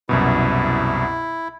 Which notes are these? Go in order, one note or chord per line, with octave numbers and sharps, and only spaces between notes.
C2 F#2 B2 E4